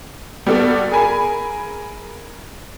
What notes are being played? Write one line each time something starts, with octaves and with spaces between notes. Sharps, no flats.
G3 B3 F#4 A4 D5
G#4 A#4 G#5 B5